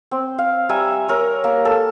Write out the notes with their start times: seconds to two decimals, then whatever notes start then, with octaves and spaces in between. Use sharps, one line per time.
0.11 C4
0.38 F5
0.69 G3 E5 G#5 A#5
1.08 A#4 C#5
1.44 A#3
1.65 A4